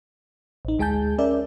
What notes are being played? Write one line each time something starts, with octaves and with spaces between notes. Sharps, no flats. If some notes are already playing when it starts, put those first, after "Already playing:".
A1 D#4
D2 G#3 G#4 G#5 A5 G6
C#4 A#4 D5 E5